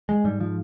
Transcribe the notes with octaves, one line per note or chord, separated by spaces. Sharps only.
G#3
G#2 G3
F3